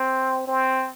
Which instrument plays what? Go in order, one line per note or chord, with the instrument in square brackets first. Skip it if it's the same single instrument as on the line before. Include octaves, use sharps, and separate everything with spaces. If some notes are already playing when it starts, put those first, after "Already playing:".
Already playing: [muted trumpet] C4
C4